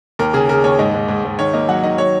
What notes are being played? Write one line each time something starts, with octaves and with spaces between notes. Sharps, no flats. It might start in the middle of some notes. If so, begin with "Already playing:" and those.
D#2 A#4
C#3 G#4
C#3 A#4
D#2 C#5
G#2 D#5
G#2
G#2
G#2
D#3 C#5
A#3 D#5
F#3 F#5
D#3 D#5
F#3 C#5